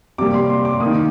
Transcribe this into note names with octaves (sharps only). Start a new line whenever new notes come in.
C3 G3 A#3 D6
C6
C6
D6
A#3 D#6
D#3